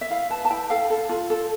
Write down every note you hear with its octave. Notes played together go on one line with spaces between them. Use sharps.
E5
E4 F5
B4 A5
A5
E4 G5
A4 F5
A4
F4
A4